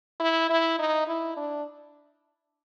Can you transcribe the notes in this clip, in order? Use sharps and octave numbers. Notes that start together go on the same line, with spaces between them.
E4
E4
D#4
E4
D4